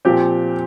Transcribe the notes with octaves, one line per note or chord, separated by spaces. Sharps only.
A#2 F3 C4 G4